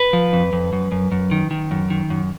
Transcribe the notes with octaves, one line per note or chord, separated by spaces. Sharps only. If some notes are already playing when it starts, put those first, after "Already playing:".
Already playing: B4
F3
F2
F2
F#2
F#2
F#2
D#3
D#3
F#2
D#3
F#2